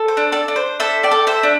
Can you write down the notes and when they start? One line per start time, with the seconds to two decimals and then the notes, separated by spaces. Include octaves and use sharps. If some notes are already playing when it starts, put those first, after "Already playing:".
Already playing: A4
0.08 C5
0.17 D4
0.32 A4 D5
0.48 D4
0.56 C5
0.80 A4 C5 E5
1.03 D5 G5
1.11 A4
1.27 C5 E5
1.43 D4